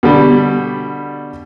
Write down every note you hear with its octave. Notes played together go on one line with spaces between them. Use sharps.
B2 D3 G3